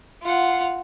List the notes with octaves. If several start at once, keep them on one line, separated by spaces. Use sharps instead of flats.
F4 F#5